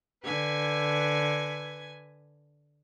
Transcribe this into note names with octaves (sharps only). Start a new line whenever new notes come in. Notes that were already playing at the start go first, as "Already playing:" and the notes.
D3 B4 G#5 G#6